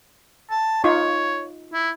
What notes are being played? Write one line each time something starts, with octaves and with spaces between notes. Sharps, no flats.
A5
D#4 F4 C#5 C#6
E4